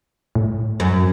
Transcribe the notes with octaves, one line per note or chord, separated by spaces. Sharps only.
A2
F#2